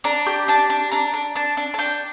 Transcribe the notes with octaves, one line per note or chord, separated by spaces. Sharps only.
D4 A#5
G4
D4 A5
D4
D4 A#5
D4
D4 A5
D4
A5
D4 G5